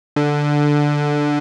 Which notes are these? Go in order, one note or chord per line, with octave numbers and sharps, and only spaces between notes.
D3